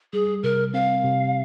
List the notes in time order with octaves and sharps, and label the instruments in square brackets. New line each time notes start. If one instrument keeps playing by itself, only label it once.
[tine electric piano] G3 [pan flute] G#4
[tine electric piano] C3 [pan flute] A#4
[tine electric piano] C4 [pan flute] F5
[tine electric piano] C3